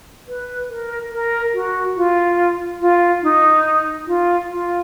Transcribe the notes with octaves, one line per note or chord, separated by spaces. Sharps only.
B4
A#4
A#4
F#4
F4
F4
D#4
F4
F4